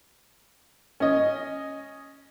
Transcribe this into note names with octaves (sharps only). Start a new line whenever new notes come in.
C#4 D#5